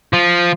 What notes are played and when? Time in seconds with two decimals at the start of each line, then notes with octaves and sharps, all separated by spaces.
0.13 F3